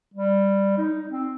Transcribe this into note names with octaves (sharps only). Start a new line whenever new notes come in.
G3
D#4
C4